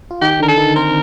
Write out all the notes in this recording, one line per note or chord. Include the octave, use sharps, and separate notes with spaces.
F4
D#3 D#4 G4
D3 D4 A#4
A4
D#3 D#4
C4 A#4 C5